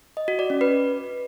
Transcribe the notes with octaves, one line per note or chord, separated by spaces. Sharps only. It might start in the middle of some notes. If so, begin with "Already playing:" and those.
D#5
F#4
D5
C#4
B4